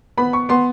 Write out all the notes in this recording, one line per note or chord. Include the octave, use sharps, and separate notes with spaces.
B3 B5
C#6
B3 C6